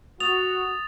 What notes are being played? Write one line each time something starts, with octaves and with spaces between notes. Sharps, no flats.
F#4 D#6 A6 F7